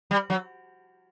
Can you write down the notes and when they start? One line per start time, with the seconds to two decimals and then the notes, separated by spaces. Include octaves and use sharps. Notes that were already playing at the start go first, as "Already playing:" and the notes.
0.11 G3
0.30 F#3